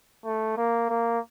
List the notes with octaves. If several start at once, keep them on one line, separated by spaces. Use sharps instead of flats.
A3
A#3
A#3